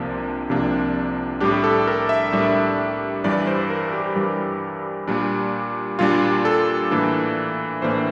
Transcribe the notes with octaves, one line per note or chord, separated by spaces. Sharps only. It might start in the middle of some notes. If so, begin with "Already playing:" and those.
Already playing: C2 C3 F3 A#3 D4 A#4
C2 C3 F3 A#3 D4
A2 G3 D4 G4
A4
A#4
E5
A2 G3 D4
G2 E3 G3 D5
C5
A#4
G4
G2 E3 G3
A#2 G3 D4
A#2 G3 D4 F4
A4
A2 E3 A#3 D4
A2 E3 A#3 D4 C5